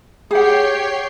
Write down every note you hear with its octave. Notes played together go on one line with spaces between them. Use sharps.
G4 G#4 C#5 F#5 G5 C7